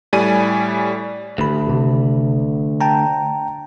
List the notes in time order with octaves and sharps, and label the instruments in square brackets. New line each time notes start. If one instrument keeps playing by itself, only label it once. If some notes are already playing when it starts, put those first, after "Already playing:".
[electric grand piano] A2 G3 D5 G#5 D#7
[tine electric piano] G#1 B5 [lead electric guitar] D2
[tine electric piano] G#1 C3
G5 A5 A#5